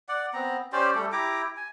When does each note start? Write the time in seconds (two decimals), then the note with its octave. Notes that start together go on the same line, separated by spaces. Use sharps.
0.09 D5 F#5
0.34 B3 C4 A#5
0.72 C#4 G4 C5 D5
0.95 G3 A3 G4 A4
1.12 E4 G4 A#5 D6
1.57 G#5